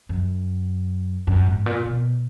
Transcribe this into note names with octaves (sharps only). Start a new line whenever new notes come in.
F#2
F#2
G#2
A#2
B2